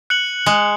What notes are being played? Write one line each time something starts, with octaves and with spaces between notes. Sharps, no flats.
F#6 C#7 F#7
G#3